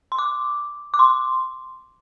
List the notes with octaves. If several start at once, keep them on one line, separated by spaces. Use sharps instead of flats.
C6
D6
D6
C6